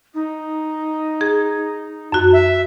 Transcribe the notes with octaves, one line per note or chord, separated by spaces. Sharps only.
D#4
G#4
F#2 F#4
E5